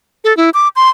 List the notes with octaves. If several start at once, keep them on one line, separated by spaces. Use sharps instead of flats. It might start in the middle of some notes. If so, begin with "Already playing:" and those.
A4
E4
D6
C6